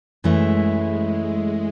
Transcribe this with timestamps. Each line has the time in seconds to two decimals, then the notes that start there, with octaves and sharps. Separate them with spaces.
0.24 F#2 E3 G#3 A3 E4
1.04 G#3